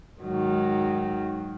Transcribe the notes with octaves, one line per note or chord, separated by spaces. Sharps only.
G#2 D#3 F#3